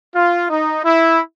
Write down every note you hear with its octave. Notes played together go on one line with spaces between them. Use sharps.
F4
D#4
E4